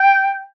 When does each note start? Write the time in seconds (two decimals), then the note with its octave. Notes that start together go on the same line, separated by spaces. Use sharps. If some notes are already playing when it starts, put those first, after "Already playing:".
Already playing: G5